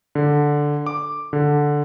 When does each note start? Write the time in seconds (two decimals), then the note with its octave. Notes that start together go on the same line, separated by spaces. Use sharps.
0.15 D3
0.86 D6
1.33 D3